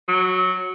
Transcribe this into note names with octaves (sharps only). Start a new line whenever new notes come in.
F#3